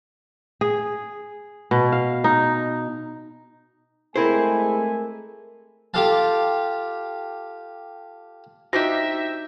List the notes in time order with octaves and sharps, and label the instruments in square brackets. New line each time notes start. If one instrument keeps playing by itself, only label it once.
[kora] G#4
B2
F5
D#4
[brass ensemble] G#3 A3 G#5 [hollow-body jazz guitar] C4 E4 C5 [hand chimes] G#4 A#4
[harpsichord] F4 G4 A4 F5 A5
[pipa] F3 D4 G4 [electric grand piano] D#4 A#6 [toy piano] F#4 [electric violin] E5